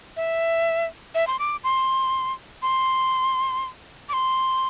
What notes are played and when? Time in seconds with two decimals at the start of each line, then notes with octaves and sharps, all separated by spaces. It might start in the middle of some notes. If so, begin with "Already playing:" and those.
0.17 E5
1.15 E5
1.27 C6
1.39 D6
1.64 C6
2.62 C6
4.09 D6
4.13 C6